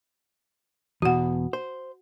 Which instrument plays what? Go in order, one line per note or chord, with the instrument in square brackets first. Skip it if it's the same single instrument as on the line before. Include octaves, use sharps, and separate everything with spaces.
[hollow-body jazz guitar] E2 B2 [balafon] F#4 F#5
[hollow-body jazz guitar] C5